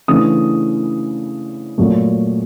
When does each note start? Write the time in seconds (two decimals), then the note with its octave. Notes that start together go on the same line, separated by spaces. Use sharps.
0.08 C#3 E3 A3 D4 D#6
1.78 A#2 F#3 A3